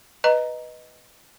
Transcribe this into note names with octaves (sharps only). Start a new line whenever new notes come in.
B4 D#5 A#5